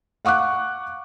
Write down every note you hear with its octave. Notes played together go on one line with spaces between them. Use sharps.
F5 F#5 C#6 D6 F#6